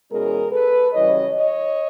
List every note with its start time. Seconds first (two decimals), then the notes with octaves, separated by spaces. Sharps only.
0.10 E2 B2 G#3 C#4 G#4 A#4
0.52 A4 B4
0.93 F#2 C#3 E3 G3 C#5 D#5
1.35 C#5 D#5